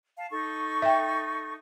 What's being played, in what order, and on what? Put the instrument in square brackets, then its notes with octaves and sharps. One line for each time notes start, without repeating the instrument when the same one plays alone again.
[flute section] F5 A5
D#4 A4 C#6
[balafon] E5 G5